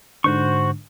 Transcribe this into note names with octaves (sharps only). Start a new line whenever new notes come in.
G#2 D3 F#4 C5 C#6